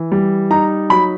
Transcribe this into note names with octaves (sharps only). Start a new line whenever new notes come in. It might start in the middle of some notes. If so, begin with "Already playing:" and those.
Already playing: E3
G3
D#4 A#5
F#3 B5